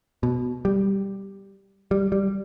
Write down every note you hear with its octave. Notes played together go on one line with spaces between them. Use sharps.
B2
G3
G3
G3